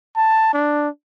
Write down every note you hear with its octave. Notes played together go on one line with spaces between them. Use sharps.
A5
D4